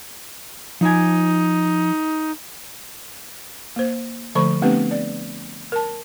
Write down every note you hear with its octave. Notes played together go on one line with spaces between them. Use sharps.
F3 D#4 G#5
A#3 C5
D3 F3 A3 C5 B5 C#6
A3 B3 C4 D4 G4 B4
D5
A#4 A5